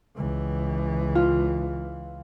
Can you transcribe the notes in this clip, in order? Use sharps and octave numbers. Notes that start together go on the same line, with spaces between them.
C#2 E3
F4